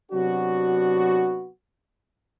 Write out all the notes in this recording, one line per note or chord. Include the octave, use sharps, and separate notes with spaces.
C3 F#3 B3 D4 F#4